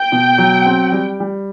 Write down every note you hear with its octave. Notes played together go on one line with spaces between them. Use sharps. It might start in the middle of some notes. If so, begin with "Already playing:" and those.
Already playing: G5
B2
F#3
C4
G3
G3